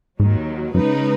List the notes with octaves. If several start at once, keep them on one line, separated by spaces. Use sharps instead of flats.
D#2 G#2 D#3 F#3
F#2 C#3 G#3 D#4 B4